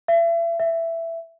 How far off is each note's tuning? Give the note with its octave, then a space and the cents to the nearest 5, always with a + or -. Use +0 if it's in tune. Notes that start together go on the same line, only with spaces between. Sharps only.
E5 +35
E5 +10